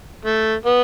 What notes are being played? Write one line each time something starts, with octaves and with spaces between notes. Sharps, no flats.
A3
B3